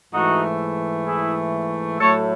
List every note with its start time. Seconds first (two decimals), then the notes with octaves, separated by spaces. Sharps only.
0.12 G#2 E3 A3 D#4 F#4
1.06 E4 G#4
1.99 A2 F#3 A3 A4 C#5